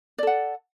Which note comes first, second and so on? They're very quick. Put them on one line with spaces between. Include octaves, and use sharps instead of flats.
D5 A4 F#5